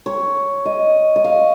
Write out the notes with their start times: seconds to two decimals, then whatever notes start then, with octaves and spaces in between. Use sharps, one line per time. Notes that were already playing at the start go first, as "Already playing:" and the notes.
0.06 C#5
0.66 D#5
1.16 D#5
1.24 F5